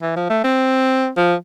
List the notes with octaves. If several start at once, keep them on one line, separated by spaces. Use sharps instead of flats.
E3
F3
A3
C4
F3